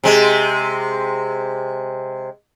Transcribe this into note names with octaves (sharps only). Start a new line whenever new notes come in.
C3 G#3